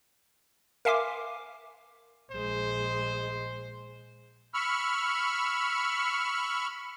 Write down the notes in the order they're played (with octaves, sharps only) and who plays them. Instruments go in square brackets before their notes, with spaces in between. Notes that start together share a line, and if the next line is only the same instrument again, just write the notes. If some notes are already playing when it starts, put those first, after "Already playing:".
[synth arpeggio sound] A#4 E5 F5 G#5 C6 D6
[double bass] A#1 G#3 [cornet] C5
[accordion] B5 C#6 E6 F6